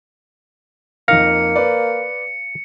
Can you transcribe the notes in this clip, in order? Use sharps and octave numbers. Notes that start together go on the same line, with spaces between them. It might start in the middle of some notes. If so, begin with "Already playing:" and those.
F2 A#3 D#4 F5 A#6 C#7
B4 D5